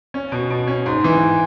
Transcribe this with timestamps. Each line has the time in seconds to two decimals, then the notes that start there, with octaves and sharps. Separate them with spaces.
0.14 C#4
0.32 B2
0.50 B2
0.68 C#4
0.86 G#2
1.04 E3